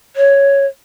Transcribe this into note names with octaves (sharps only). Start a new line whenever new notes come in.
C#5